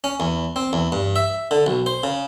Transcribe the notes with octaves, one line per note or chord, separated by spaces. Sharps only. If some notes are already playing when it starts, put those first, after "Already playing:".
C#4
E2
C4
E2
G2
E5
D3
B1
C5
C#3